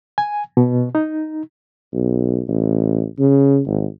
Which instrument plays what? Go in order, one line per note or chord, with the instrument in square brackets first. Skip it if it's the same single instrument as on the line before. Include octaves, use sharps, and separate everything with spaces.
[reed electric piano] G#5
B2
D#4
[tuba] B1
A1
C#3
G#1